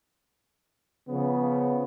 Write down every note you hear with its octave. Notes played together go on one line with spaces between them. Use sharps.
C#3 F3 B3